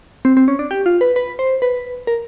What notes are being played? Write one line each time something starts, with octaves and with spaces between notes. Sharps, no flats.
C4
C4
C#4
D4
G4
F4
B4
B4
C5
B4
A#4